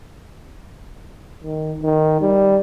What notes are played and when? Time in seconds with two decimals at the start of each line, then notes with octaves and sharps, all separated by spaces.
1.44 D#3
1.83 D#3
2.21 G3